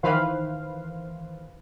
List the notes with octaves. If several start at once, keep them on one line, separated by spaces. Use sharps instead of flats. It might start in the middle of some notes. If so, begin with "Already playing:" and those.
D#3 E3 B4 C5 F5